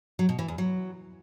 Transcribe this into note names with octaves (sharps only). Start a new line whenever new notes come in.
F#3
B2
E3
E2
F#3